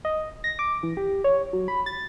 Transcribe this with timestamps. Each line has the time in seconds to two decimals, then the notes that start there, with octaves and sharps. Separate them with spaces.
0.05 D#5
0.44 A#6
0.59 D6
0.83 E3
0.97 G4
1.24 C#5
1.53 F#3
1.68 B5
1.86 A6